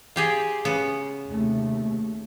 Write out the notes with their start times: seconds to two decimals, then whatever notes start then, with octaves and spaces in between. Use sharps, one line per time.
0.16 F4 G4 G#4
0.65 C#3 B3
1.27 D#2 C3 A3